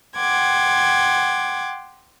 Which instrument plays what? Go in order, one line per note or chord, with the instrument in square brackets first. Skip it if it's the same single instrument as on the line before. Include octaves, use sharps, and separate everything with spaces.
[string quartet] F#5 G5 C6 D6 G#6